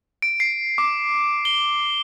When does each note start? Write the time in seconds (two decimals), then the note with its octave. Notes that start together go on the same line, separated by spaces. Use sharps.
0.22 D7
0.40 C7
0.78 D6
1.45 G7